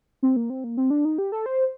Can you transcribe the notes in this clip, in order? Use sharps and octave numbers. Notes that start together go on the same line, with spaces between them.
C4
A#3
C4
A#3
C4
D4
D#4
G4
A4
C5